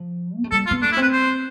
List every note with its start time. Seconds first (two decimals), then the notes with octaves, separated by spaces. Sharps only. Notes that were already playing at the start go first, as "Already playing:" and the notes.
Already playing: F3
0.37 B3
0.44 A3
0.51 G3 A4
0.66 F4
0.71 B3
0.82 A3 D4
0.92 E4
0.97 C4 B4
1.12 C5